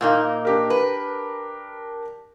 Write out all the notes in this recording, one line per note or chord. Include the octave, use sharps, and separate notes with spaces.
A#2 A#3 D#4
D4 G4 A#4
B4